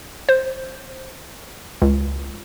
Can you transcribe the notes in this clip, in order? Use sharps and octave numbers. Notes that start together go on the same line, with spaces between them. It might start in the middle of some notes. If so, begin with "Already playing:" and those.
C5
C#2